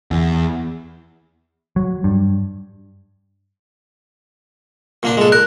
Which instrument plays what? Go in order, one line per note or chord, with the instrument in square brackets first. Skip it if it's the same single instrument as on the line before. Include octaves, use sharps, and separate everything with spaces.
[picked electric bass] E2
F#3
G2
[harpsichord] A#2 A#3 D4
G#3 A4
[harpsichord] A#4 [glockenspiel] F#6